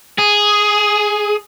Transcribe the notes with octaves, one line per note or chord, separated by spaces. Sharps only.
G#4